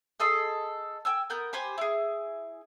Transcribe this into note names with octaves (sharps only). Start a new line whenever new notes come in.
G#4 A4 D#5 C6
G5 G#5 E6
B3 A#4 G6
G4 B4 C5 G#5
E4 G#4